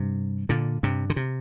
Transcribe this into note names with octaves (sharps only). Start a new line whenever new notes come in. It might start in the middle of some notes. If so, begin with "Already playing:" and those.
Already playing: G2 C3
A#2 D3
G2 C3
D3
C3